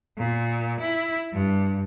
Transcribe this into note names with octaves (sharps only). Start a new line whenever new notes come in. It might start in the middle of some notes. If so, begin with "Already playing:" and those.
A#2
E4
G2